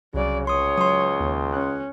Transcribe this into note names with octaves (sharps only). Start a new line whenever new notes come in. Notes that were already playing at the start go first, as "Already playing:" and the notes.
C2 C#3 F#3 D5
C#2 C#5 C6 D#6
F#3 C6 D#6
D#2
C#4 F#6